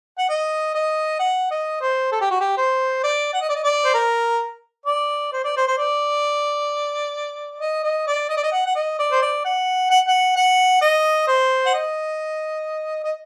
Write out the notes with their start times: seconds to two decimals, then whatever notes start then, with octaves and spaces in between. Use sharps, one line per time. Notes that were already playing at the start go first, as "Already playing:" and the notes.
0.18 F#5
0.29 D#5
0.74 D#5
1.19 F#5
1.51 D#5
1.81 C5
2.11 A4
2.21 G4
2.30 F#4
2.40 G4
2.57 C5
3.03 D5
3.33 F#5
3.41 D#5
3.49 D5
3.55 D#5
3.63 D5
3.84 C5
3.94 A#4
4.86 D5
5.32 C5
5.44 D5
5.56 C5
5.68 C5
5.77 D5
7.61 D#5
7.84 D#5
8.07 D5
8.29 D#5
8.37 D5
8.43 D#5
8.53 F#5
8.65 F#5
8.75 D#5
8.99 D5
9.12 C5
9.22 D5
9.45 F#5
9.90 F#5
10.08 F#5
10.36 F#5
10.81 D#5
11.27 C5
11.66 F#5
11.74 D#5
13.04 D#5